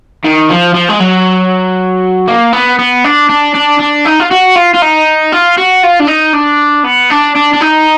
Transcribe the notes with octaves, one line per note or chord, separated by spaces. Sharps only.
D#3
F3
F3
G#3
F#3
A#3
B3
B3
D4
D4
D4
D4
D#4
F4
F#4
F4
F4
D#4
F4
F#4
F4
D4
D#4
D4
B3
D4
D4
D4
D#4